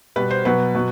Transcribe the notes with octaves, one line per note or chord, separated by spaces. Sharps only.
B2 G3 B3 B4
C5
B2 F#3 B3 B4
B2 F#3